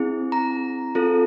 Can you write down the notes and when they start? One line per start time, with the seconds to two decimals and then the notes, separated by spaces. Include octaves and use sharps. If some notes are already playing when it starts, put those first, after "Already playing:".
Already playing: C4 E4 G#4
0.32 A#5
0.95 C4 F4 A4